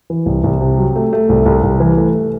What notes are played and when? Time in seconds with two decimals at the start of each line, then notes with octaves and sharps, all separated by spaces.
0.10 E3
0.26 C2
0.44 C2
0.61 C3
0.78 F#3
0.96 A3
1.13 A3
1.29 C2
1.46 C2
1.63 C2
1.80 E3
1.97 A3